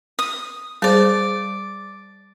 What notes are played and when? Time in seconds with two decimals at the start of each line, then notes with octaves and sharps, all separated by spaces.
0.19 D#6
0.82 G3 G#4 C5 D5 A5